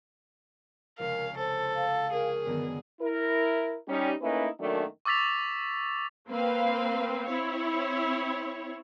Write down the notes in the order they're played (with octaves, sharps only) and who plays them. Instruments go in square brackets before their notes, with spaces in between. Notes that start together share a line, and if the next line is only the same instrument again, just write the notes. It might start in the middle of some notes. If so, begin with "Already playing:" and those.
[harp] F1 C#2 C#4 [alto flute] A#4 [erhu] F5
[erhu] A4 [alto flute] C5
[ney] F5
[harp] C#4 G5 [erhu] G#4 [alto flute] A#4
[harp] F#2 D3 D#3 [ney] B3
[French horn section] E4 A#4
G3 C#4 D#4
A3 A#3 C#4 D#4 E4 B4
F#2 D#3 F#3 A3 A#3 D4
[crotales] C#6 D6 E6 A6 B6 F7
[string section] A#3 C4 B4 F5
C4 E4 C#5